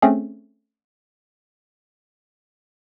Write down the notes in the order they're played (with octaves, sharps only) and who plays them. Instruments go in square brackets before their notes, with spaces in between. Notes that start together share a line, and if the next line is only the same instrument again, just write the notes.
[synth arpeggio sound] A3 C4 C#4 G#4